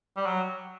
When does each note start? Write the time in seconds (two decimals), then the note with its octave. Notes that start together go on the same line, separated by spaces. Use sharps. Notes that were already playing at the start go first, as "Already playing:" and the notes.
0.17 G3
0.26 F#3